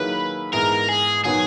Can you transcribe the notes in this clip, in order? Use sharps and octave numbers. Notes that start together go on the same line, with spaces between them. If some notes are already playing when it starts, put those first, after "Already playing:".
Already playing: D#3 F#3 A#3 E4 G#4 B4
G#2 E3 B3 E4 G#4 A#4
G#4
D#3 F#3 B3 F#4 G#4